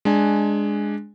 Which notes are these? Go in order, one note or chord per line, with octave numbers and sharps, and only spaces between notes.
G#3 D4 G#5